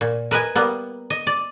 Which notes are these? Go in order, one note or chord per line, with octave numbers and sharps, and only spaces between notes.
A#2
A#4 B4 D#5 G#5
G3 A#3 B3
D#5
D5